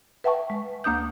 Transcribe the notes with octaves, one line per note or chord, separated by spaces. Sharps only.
B4 E5 F#5 G5 A5 C#6
G#3
D2 A#3 D4 D#6 G6